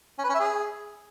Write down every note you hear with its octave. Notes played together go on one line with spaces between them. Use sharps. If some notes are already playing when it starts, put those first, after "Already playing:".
C#4
B4
C#4
E5
G#4